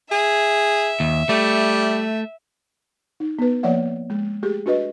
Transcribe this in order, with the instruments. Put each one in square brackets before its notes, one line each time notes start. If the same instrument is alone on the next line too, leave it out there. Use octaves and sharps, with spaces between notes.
[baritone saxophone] G#4 [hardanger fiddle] E5
[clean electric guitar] D#2
[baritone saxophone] G3 [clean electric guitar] A3
[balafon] D#4
B3 B4
F3 A#3 C#5 D5 E5 F#5
G#3
A3 G4 G#4
D4 F#4 B4 D#5